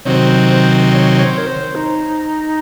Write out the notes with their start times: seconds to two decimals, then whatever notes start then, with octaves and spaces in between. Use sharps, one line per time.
0.05 C3 D#3 F#3 C4 C5 C#5
0.91 D#5
0.94 C#5
1.18 C#5
1.38 A#4
1.47 C5
1.75 D#4